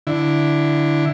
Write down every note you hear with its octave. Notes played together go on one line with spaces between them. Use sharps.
D3 E4